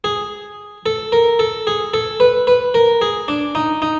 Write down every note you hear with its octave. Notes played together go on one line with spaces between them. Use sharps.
G#4
A4
A#4
A4
G#4
A4
B4
B4
A#4
G#4
D4
D#4
D#4